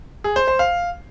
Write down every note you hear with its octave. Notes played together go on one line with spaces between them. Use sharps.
G#4
C5
C5
F5